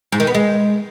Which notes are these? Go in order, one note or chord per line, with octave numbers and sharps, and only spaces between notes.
G#2
D#3
B3
G#3